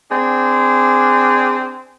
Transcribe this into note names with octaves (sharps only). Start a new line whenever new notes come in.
C4 D4 G#4